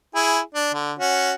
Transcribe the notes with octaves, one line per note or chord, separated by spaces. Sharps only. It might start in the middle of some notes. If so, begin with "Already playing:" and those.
E4 G#4
D4
D3
C#4 F#4